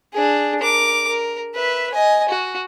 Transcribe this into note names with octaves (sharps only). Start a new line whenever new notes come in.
D4 G#4
A#4 D6
A#4
B4 E5
D#5 G#5
F#4